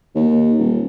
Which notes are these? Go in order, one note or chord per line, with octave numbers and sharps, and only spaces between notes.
D#2
D#1